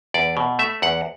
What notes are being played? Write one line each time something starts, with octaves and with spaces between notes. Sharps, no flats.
E2 D5
B2
A3 E5
E2 F#5